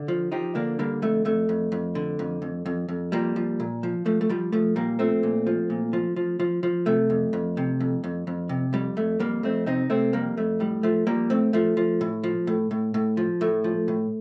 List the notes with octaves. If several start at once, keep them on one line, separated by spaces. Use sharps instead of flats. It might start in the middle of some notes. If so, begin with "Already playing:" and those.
Already playing: D3 D4
F3
F3 D#4 G4
D3 A#3 D4
D3 G3 A#3
F2 A3
F2 A3
F2
F2
D3
F2
F2
F2
F2
F3 G3 A#3
F3
A#2
F3
F3 A3
A3
F3 G3
F3 A3
A#2 G3 A#3
F3 A3 C4
A#2
F3
A#2
F3
F3
F3
F3
C3 A3
F2
F2
C3
F2
F2
F2
C3
F2 G3
F2 A3
F2 G3 A#3
F2 A3 C4
C3 C4 D#4
C3 A3 C4
F2 G3 A#3
F2 A3
A2 G3
F3 A3
F3 G3 A#3
A2 A3 C4
F3 A3
F3
A2
F3
A2
A2
A2
F3
A2 A3
F3
A2